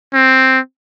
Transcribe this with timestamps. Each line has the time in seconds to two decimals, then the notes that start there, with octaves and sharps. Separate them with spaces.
0.14 C4